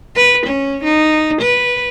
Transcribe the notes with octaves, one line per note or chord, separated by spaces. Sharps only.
B4
C#4
D#4
B4